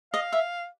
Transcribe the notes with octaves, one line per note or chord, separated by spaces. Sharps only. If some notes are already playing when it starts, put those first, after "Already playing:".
D#5 F5
E5